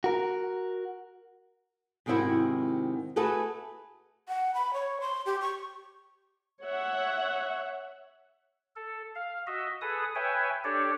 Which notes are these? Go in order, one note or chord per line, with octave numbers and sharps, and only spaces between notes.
F#4 A#4
G#2 C3 D#3 C4 E4 F#4
A3 F#4 G#4 A4 B4
F#5
B5
C#5
C6
G4
C#6
C#5 E5 F#5
A4
F5
F#4 D#5 E5
G#4 A4 B4 D#6
B4 C#5 E5 G5 G#5
D4 G4 A4 C#5 D5